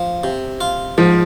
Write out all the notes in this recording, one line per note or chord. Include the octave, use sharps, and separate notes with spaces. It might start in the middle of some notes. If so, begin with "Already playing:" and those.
Already playing: F3
C3
F4
G#2 F3